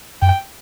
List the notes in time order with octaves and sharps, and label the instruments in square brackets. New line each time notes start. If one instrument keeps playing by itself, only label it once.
[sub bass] F#2 [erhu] G5